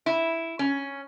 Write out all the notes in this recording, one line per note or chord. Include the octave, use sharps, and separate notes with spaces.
E4
C#4